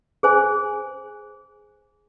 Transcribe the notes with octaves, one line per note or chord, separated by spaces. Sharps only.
G#4 C5 G#5